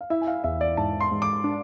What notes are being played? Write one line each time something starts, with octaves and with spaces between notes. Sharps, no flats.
F5
E4 E5
G#5
F5
E2 E5
D5
G#2 A5
C6
G#2
D6
D4